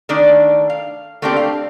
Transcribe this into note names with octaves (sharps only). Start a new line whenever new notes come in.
D#3 A3 D4 D5
F5
A3 A#3 C4 D4 G4 A4
F5